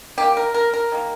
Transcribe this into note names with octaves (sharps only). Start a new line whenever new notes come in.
D#3 A#3 G4
A#4
A#4
A#4
D#3 A#3